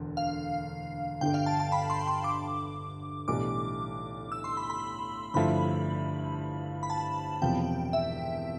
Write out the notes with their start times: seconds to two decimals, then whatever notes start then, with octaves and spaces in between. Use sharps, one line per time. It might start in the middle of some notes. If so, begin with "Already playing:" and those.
Already playing: E1 D2 D3
0.17 F5
1.21 G1 G2 D3 G5
1.34 F5
1.46 A5
1.60 A5
1.72 B5
1.90 C6
2.07 C6
2.24 D6
3.28 B1 A2 E3 G3 D4 D6
4.32 E6
4.44 C6
4.57 B5
4.70 B5
5.34 G1 G2 F3 A3 E4 B5
6.83 B5
6.90 A5
7.42 E1 E2 C3 F3 G5
7.93 E5